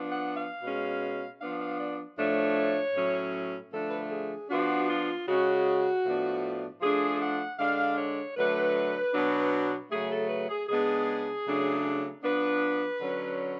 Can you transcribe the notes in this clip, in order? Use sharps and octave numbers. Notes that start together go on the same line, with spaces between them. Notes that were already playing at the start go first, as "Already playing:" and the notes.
Already playing: F3 B3 D4
F#5
F5
B2 G#3 C#4
F3 B3 D4 F5
F5
D5
A2 F3 A3 D4 C#5
A2 F#3 C#4
D3 F3 A3 D4 A4
B4
A4
G#4
F3 B3 D4 F#4
F4
C#3 G#3 C#4 F#4
A2 F3 B3 D4
F3 A3 D4 G#4
F#5
D3 G#3 D4 F5
C#5
D3 F#3 A3 D4 B4
B2 F#3 B3 D4
C#3 F#3 A3 G#4
A4
B4
G#4
C#3 G#3 B3 D4 G#4
C#3 F#3 A3 D4
F3 B3 D4 B4
D3 F#3 C#4